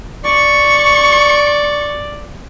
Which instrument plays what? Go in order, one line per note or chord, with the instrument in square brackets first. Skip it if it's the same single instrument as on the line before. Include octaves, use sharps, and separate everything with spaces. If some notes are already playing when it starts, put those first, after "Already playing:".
[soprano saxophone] D5 [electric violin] C#6